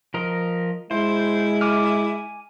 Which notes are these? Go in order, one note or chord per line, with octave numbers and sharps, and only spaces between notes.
F3 A#4 D#5
G#3 E4 C5
G#5 D6 F6